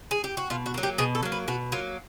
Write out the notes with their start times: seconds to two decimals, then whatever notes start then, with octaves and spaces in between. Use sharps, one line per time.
0.11 G#4
0.24 G4
0.37 F#4
0.50 B2 F4
0.66 F#4
0.74 F#3 A#3
0.83 G4
0.98 B2 G#4
1.15 A4
1.23 F#3 A#3
1.32 B4
1.48 B2 F#4
1.72 F#3 A#3 F4